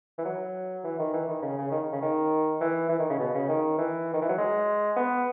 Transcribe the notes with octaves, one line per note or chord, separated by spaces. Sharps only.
E3
F#3
E3
D#3
E3
D#3
C#3
C#3
D#3
C#3
D#3
E3
E3
D#3
C#3
B2
C#3
D#3
E3
D#3
E3
F#3
G#3
B3